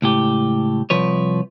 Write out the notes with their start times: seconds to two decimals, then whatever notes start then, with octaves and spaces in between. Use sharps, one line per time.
0.02 C#2 A2 G4
0.90 C2 F3 B4 C#5